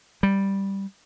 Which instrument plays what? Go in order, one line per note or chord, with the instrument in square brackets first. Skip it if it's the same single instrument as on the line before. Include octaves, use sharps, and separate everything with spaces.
[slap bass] G3